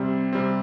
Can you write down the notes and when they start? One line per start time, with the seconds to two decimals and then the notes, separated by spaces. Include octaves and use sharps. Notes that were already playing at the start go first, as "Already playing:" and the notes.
Already playing: C3 G3 C4
0.33 C3 G3 C4